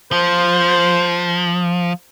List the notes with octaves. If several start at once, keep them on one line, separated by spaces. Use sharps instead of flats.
F3 C5